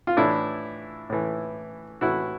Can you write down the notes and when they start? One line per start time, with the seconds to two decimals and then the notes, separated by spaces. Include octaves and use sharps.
0.07 F4
0.17 A2 E3 D4 E4
1.10 A2 E3
2.01 A2 E3 E4 F#4